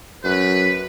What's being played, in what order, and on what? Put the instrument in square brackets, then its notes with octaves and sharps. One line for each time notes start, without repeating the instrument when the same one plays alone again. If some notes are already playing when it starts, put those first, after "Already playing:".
[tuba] F#2 [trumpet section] B4